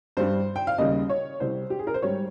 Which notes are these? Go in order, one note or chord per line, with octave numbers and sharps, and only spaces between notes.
G2 G3 C5
G5
F5
D#2 C#3 G3 D#5
C#5
C2 C3 G3 C5
G4
G#4
A#4
C5
G#2 G3 C#5